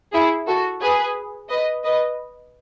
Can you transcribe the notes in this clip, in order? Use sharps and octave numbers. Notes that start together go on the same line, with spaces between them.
E4 G#4
F#4 A4
G#4 B4
B4 D#5
B4 D#5